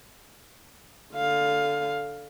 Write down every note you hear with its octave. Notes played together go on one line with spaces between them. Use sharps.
D3 F5